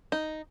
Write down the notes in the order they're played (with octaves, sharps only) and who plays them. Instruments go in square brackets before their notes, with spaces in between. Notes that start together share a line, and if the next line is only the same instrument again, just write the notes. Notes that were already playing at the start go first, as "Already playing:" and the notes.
[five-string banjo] D#4